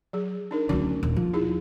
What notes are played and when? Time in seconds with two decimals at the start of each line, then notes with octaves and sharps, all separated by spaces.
0.13 F#3 G#4
0.51 D4 D#4 A#4
0.69 D2 C#3 F#3 D4 F#4
1.03 D#1
1.16 F3
1.33 D#4 E4 G#4